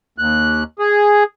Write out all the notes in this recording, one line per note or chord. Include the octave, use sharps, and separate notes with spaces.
D#2 F#6
G#4